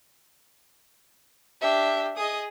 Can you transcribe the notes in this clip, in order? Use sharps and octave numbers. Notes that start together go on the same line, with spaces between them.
D4 G4 E5
G#4 D#5 D#6